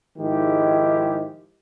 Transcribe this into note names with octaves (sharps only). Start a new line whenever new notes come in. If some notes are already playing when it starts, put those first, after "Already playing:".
G#2 D#3 F3 G#3 E4 G4